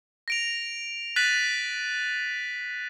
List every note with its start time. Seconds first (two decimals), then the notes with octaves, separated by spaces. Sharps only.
0.28 A#6 D7 F7
1.16 F#6 A6 B6 D#7 F#7